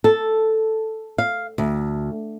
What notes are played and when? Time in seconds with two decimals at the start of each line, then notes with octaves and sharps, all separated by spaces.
0.04 A4
1.18 F5
1.58 D2